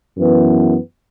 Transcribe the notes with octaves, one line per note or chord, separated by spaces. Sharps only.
F#2 E3 B3